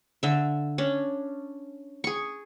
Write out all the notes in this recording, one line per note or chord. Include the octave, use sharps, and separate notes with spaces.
D3 E5
C#4 D4
G#4 C#6